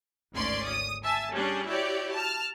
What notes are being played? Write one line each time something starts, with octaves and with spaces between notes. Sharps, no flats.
G#1 D2 C#4 D5 C6
D#6
E5 G#5 A5
G3 C#4 D4 G#4
E4 F#4 G4 C#5 D5
A5 F6